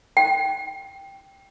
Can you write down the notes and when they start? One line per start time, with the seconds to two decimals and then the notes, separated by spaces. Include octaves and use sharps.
0.17 G5